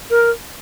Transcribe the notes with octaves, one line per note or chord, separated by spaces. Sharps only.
A#4